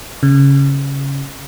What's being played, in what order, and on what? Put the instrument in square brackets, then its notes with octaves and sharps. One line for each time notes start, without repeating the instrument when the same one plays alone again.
[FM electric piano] C#3